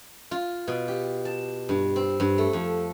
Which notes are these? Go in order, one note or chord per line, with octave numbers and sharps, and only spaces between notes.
F4
B2
G4
A5
G2
C4
G2
A3
F2